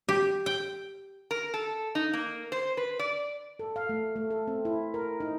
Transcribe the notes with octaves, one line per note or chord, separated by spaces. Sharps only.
G4
G5
A#4
A4
D#4
A#3
C5
B4
D5
A4
F5
A3
A3
A4
C4
E4
A#4
D#4